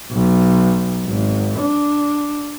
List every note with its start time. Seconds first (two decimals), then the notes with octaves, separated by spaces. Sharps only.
0.11 B1
1.06 G#1
1.60 D4